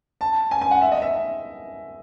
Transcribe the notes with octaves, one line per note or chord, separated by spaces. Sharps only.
A5
G#5
G#5
F#5
E5
D#5
E5